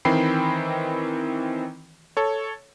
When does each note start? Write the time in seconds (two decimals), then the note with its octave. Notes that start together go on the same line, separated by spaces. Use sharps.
0.05 D#3 E3 C4 G5 B5 C7
2.17 A4 C#5